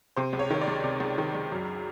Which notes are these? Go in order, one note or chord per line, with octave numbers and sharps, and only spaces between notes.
C3 C5
C#2
C#5
D#3 C#5
D5
C#2
C3
C#2
D#3
C#2
F#2